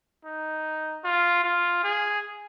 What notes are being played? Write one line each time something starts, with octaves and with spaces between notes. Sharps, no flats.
D#4
F4
F4
G#4